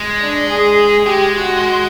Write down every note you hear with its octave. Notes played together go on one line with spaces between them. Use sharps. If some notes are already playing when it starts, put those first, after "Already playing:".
Already playing: G#3
D4
G#4
G#3 G4
F#4